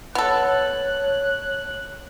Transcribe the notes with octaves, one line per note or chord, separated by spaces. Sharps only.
B3 A4 C#5 F#6